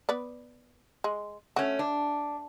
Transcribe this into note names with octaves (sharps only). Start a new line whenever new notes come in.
B3 B4 D5
G#3
A3 C#4 F#4
D4